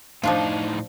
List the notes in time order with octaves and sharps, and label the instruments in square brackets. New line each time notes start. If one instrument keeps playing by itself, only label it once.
[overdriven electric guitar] A2 D#4 [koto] F3 D4 F4